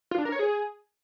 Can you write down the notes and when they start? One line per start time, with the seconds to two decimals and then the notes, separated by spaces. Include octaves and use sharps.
0.11 F4
0.18 D4
0.25 A#4
0.32 C#5
0.39 G#4